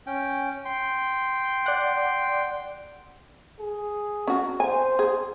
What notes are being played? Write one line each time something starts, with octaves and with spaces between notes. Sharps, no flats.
C#4 G5
G5 C6
D5 F#5
G#4
C#4 F#4
C5 G#5
G#4